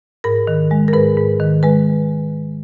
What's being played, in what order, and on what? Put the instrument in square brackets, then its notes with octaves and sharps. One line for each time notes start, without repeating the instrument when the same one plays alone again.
[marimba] G#2 A#4
D#3
G#3
A#4
G#2 B4
G#2
D#3
G#3 B4